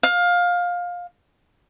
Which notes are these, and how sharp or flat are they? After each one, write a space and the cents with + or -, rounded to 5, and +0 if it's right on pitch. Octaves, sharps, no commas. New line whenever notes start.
F5 +20